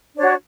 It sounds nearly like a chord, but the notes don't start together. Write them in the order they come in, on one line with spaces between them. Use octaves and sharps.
D4 C#5 F#4